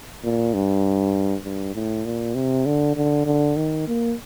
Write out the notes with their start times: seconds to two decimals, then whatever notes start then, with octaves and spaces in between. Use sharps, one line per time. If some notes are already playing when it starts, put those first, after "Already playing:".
0.24 A#2
0.54 G2
1.45 G2
1.75 A2
2.05 A#2
2.35 C3
2.66 D3
2.97 D3
3.26 D3
3.57 D#3
3.88 A#3